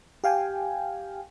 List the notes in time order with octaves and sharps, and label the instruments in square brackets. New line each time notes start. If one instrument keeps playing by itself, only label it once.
[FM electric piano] G4 F5 G5 G#5